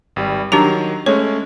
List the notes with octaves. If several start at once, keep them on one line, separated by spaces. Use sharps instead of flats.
G#1 G3
D#3 F#3 D4 G4 A#5
G#3 A3 C#4 C#5